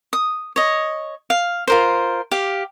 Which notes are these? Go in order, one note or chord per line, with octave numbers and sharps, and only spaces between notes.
D#6
C#5 D#5
F5
F4 A#4 C5
G4 F5